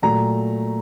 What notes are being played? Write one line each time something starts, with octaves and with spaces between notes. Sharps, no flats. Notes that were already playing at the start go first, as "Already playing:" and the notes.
A#2 F#3 A3 A#5